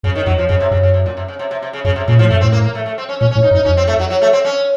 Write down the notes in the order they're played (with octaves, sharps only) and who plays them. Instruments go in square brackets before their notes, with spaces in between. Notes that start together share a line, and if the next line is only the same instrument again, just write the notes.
[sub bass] F#2 [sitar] C#3
[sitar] D#3
[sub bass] F2 [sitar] F#3
[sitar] F3
[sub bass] F#2 [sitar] C#3
[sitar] C3
[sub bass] F#2 [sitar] C#3
[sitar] C#3
C3
A#2
C3
C#3
C3
C3
C3
C#3
[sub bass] F#2 [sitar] C#3
[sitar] C3
[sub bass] A#2 [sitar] C#3
[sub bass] A2 [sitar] F3
[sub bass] F#2 [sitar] A3
[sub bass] A2 [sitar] C4
[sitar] A#3
A#3
A3
A3
C4
C#4
[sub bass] A#2 [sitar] C#4
[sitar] C#4
[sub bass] A2
[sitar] D#4
[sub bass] F#2
[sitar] D#4
[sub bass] F2 [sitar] C#4
[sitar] C4
A3
F#3
F#3
A3
C4
C#4